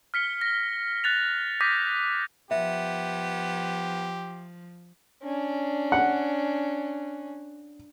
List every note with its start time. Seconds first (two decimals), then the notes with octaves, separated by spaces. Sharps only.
0.14 F6 B6 C#7 G7
0.41 A#6
1.04 F#6 A6 F7
1.61 D6 D#6 G6 A#6 B6 D#7
2.51 F3 B3 G4 E5
5.23 C#4 D4
5.92 F#5